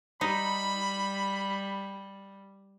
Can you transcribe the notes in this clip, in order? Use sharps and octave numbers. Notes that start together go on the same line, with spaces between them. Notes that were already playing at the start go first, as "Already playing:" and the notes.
G3 D#4 B5